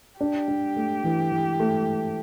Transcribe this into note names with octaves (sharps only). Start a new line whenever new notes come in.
D4 G4
D4
A3
E3
E3
A3